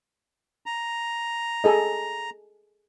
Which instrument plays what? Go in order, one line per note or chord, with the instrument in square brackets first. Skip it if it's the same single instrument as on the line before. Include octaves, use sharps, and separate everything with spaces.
[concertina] A#5
[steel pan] G#4 A4 D#5